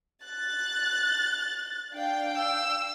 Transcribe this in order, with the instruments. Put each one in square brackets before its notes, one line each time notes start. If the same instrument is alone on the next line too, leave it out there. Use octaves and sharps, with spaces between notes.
[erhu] F#6 [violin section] A6
[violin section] D4 F5 G5
[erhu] E6